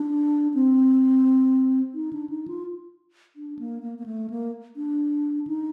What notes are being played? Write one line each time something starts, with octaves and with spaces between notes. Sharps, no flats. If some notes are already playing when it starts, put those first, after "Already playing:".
Already playing: D4
C4
D#4
D4
D#4
F4
D4
A#3
A#3
A#3
A3
A#3
D4
D#4